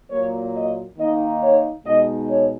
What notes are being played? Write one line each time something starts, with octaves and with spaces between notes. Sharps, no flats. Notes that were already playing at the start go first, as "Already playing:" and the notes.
A#2 F#3 A#3 C#5
D#5
D#3 A#3 D#4 D#5
C#5
B2 G#3 D#4 D#5
C#5